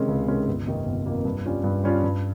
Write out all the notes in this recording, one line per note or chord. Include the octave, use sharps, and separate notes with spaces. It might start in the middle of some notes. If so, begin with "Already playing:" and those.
Already playing: C3 D#3 G#3 C#4
C#2
C3 D#3 G#3 C#4
G1
F2 C3 D#3 A#3
G1
F2 C3 D#3 A#3
G2
G3 C#4 F4
G2
G3 C#4 F4
G2